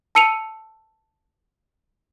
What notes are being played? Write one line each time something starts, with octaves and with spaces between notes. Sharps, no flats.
A5 E6 C#7 D#7 F7